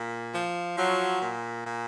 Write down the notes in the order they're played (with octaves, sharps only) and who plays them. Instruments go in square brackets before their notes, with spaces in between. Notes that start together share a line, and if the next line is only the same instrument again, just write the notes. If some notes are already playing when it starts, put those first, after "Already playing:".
Already playing: [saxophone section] A#2
F3
F3 F#3
A#2
A#2